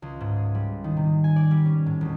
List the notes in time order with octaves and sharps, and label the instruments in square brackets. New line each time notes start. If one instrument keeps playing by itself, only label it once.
[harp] C#2
G#2
G#4
G3
D#3
C3
G#5
D5
G3
C#4
A2
E1